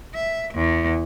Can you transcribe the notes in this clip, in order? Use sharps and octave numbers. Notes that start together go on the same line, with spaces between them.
E5
E2